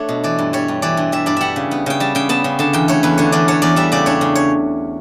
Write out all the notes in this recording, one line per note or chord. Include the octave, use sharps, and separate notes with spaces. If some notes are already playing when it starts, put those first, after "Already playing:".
Already playing: A3 D4 C#5 F#5
B2
E3 D5
G2
G3 C#5
G2
E3 D5
G2
G3 E5
G2 D5
G3 E5 F#5
C#3
B3
C#3 G5
G3 A5
C#3 G5
B3 A5
C#3
D3 A5
E2 G5
A3 C#5
E2 B4
D3 C#5
E2 D5
A3 C#5
E2 D5
G3 E5
C#3 D5
D4 C#5
C#3
C#5